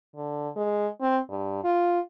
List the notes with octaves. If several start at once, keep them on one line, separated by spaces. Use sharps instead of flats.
D3
G#3
C4
G2
F4